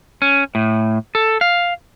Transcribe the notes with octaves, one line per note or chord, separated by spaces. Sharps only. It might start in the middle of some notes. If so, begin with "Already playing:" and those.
C#4
A2
A4
F5